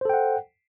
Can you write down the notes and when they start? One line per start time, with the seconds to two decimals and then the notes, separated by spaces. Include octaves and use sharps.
0.01 C5
0.05 A4
0.10 G5
0.14 F#5